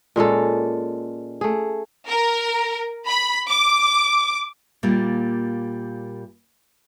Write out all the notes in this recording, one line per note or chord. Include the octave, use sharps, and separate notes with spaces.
A#2 G#3 C#4 A4
A3 G#4
A#4
B5
D6
A#2 G3 A#3